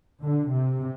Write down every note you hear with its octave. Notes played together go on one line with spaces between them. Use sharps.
D3
C3